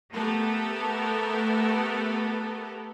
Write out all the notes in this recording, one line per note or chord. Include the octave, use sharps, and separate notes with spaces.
A3 B3 G4 A4 A#4